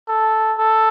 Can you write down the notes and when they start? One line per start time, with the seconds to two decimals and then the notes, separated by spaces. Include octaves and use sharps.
0.08 A4
0.58 A4